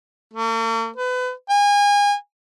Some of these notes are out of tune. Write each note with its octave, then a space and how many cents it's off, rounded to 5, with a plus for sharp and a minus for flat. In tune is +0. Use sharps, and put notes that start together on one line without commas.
A#3 -45
B4 +30
G#5 -30